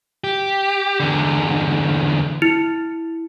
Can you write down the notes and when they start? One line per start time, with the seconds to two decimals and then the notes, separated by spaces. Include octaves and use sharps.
0.24 G4
1.00 E2 D3
2.42 E4